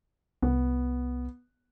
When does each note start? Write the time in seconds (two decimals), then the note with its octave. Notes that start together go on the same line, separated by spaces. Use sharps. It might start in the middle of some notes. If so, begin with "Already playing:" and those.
0.42 C2 B3